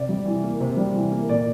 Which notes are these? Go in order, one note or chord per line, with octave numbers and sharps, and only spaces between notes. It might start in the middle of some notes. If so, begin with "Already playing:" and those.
Already playing: C3 D5
G3
E3
A#3
C3 C5
G3
E3
A#3
A#2 D5